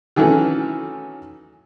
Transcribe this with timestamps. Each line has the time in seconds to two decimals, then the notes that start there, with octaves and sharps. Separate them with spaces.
0.16 D#3 E3 F#3 A3 C#4